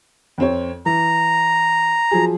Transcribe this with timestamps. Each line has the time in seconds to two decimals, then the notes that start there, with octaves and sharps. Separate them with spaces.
0.38 F2 C4 C#5
0.86 E3 A#5
2.11 F3 F#3 G#4